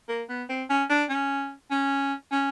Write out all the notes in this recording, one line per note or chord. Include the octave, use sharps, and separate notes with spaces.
A#3
B3
C4
C#4
D4
C#4
C#4
C#4